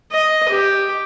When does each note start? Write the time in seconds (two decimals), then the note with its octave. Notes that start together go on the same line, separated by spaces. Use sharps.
0.12 D#5
0.49 G4